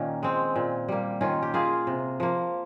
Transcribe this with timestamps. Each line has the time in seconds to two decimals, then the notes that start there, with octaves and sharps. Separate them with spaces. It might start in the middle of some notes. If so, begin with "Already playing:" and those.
Already playing: A#2 D#3 A#3 C#4
0.23 G#3 C4
0.56 A#2
0.88 G3 A#3
1.21 D#3 C#4 F4
1.42 G4
1.54 A#3 F4 G#4
1.87 C3
2.20 F3 A#3